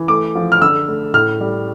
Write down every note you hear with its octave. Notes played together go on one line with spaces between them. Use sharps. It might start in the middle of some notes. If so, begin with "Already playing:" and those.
Already playing: E3
A3 D6
F3
F6
D3 E6
A3
A2 F6
G3